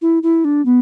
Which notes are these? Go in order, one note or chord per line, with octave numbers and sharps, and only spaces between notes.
E4
E4
D4
B3